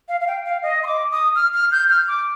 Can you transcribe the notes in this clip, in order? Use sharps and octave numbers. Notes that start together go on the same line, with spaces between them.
F5
F5
G5
F5
D#5
C6
D6
D#6
F6
F6
G6
F6
D6